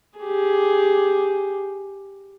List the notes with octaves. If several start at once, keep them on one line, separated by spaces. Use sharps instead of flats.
G4 G#4